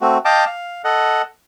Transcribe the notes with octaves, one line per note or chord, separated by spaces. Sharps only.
A3 C4 F#4
D#5 F5 G5 A5 D6
F5
A4 D#5 F#5